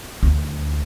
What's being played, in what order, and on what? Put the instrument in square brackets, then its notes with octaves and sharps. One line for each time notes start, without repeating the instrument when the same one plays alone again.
[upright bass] D2